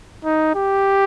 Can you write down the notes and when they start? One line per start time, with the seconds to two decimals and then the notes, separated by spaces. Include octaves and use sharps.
0.24 D#4
0.56 G4